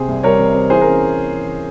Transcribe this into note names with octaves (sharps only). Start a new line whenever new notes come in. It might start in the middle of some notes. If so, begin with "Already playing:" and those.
Already playing: C3 C4 G#4 C5
C2
G3 A#4 C#5
C3
C4
E3 G#4 C5
C#4 A#4